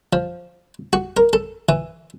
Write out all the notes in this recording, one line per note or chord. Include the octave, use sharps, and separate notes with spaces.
F3
F#4
A#4
A4
E3